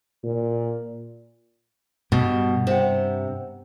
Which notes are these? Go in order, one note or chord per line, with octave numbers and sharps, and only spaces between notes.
A#2
G2 B2 G3
C3 C5 F#5